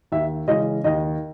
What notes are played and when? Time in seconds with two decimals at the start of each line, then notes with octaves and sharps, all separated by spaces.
0.12 D#2 E5
0.47 C#3 E3 G#3 C#4 D#5
0.84 D#2 D#5